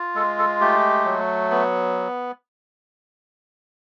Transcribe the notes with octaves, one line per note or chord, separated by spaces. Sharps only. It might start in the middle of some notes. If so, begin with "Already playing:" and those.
Already playing: F4
G#3 A4
A4
A3 G4
F#3
B3